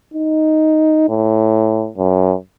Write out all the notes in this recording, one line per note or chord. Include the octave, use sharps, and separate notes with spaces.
D#4
A2
F#2